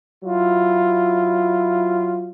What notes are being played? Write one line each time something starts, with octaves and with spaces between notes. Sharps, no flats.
F#3 E4 F4